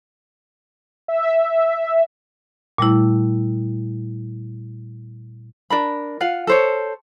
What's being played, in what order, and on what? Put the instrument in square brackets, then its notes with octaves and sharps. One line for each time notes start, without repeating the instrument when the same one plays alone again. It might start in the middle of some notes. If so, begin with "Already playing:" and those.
[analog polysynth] E5
[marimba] A#2 G3 A3 E4
[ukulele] D4 A#4 B5
F4 F5 F#5
A4 C5 C#5